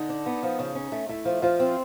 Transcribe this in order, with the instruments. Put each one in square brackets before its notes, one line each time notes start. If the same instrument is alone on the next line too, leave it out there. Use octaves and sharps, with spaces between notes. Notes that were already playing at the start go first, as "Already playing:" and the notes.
Already playing: [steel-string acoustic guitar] D3 [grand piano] D#4
[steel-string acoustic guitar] D4
B3
F3
C#3
C#4
A3
[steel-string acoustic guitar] A3 [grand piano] E4
[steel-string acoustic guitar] F3
[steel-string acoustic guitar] F3 [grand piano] F4
[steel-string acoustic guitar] C4